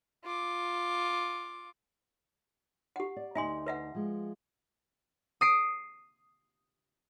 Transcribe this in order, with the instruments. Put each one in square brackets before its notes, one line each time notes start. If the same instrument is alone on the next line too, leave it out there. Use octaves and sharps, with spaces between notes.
[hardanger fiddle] F4 D6
[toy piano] G4 F#5
[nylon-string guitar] D5
[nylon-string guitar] D2 G2 D#4 [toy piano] E5 G#5 C6
[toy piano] B4 E5 F#5
[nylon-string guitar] F3 G#3
[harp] D#6 C7 D7